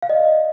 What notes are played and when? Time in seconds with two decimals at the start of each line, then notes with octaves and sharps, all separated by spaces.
0.02 F5
0.09 D5 D#5